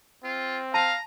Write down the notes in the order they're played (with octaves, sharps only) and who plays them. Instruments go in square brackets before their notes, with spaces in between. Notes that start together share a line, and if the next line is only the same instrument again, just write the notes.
[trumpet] C4 [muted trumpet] F4
[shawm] F5 [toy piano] A5 [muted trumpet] A#5